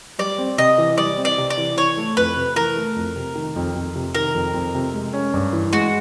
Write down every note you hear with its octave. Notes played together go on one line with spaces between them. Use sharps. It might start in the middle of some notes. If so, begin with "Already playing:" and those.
G3 D5
C4
C3 D#5
E3
G3 D5
C4
D5
C3
D5
E3
E3 C#5
A3
F2 B4
C3
E3 A#4
A3
F2
C3
D#3
F2
F2
C3
D#3 A#4
F2
F2
C3
G#3
C#4
G2
E3
G#3 F#4